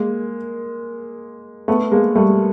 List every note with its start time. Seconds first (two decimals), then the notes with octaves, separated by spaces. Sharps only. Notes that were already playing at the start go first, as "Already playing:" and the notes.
Already playing: G#3 A#3
1.68 A3 B3
1.92 G#3 A#3
2.15 G3 A3